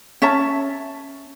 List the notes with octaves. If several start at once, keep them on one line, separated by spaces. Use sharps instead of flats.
C#4 E5 A5